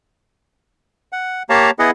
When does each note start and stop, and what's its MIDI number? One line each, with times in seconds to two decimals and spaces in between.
1.12 1.43 78
1.50 1.71 58
1.50 1.71 67
1.50 1.71 73
1.50 1.71 77
1.50 1.71 81
1.50 1.71 82
1.79 1.91 59
1.79 1.91 64
1.79 1.91 68
1.79 1.91 75
1.79 1.91 78